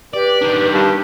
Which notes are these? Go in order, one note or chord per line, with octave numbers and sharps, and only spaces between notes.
G4 B4 D5
D#3 D4
G2 A5